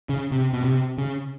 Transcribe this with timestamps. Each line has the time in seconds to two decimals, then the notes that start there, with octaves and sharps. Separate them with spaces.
0.09 C#3
0.32 C3
0.53 B2
0.64 C3
0.98 C#3